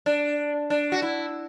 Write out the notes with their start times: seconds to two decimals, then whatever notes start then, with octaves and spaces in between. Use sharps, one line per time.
0.06 D4
0.70 D4
0.92 F#4
1.02 E4